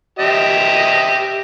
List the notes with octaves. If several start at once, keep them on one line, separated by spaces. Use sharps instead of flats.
G4 D#5 E5